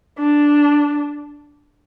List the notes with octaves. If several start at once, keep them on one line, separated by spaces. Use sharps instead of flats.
D4